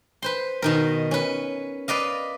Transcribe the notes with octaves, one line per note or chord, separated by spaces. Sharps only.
B4 C5 C6
B2 D#3 A#4
C#4 B4
B4 D5 D#5 F5